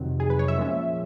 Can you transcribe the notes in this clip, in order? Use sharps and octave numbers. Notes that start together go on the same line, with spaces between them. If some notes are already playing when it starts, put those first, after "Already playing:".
Already playing: F2 C3 D#3 F#3
G#4
B4
C#5
E5
A#2 F3 G#3 C#4